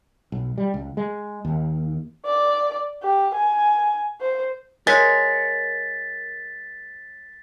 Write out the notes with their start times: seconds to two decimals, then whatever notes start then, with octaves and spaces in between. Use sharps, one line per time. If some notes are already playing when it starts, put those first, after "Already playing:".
0.32 B1
0.58 G3
0.74 C#2
0.97 G#3
1.45 D#2
2.26 D5
3.03 G4
3.35 G#5
4.21 C5
4.87 G#3 A#4 C#5 A6 B6